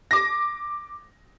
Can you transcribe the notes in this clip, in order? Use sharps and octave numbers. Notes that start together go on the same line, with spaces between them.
D6 A#6